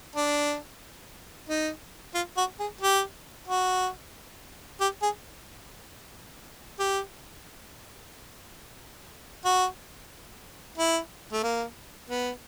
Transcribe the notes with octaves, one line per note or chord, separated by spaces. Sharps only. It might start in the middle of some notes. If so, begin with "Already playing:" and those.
D4
D#4
F4
F#4
G#4
G4
F#4
G4
G#4
G4
F#4
E4
A3
A#3
B3